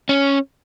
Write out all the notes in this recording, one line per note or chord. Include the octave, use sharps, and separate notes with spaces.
C#4